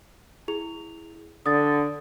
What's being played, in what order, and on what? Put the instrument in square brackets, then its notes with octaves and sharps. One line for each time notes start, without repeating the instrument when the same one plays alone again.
[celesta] E4 G#4 F7
[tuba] D3 [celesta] D#6 A6